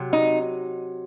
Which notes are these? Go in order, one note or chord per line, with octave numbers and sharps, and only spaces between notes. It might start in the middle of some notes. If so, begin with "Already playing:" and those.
Already playing: C3 F#3
D#4